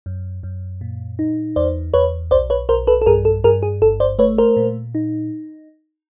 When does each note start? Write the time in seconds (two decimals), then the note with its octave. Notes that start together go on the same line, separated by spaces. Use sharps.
0.06 F#2
0.43 F#2
0.81 A#2
1.19 D#4
1.56 E2 C5 D5
1.94 E2 B4 C#5
2.31 B1 C5 D5
2.50 B4 C#5
2.69 B1 A#4 C5
2.87 A4 B4
3.02 A4
3.06 G2 G#4 A#4
3.25 A4
3.44 G2 G#4 A#4
3.63 G#4
3.81 G1 A4
4.00 C5 D5
4.19 A3 B4 C#5
4.38 A#4 C5
4.57 A#2
4.95 D#4